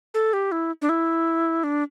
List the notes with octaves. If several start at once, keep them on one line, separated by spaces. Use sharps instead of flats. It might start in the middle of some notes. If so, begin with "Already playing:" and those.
A4
G4
E4
D4
E4
D4